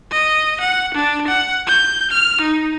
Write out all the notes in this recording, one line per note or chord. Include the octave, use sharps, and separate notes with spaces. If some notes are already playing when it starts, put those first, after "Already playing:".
D#5
F#5
D4
F#5
G6
F6
D#4